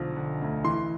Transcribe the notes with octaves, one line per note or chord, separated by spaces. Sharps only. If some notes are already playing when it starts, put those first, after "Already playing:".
Already playing: B1 D3 F3
D3
D2
E3 C6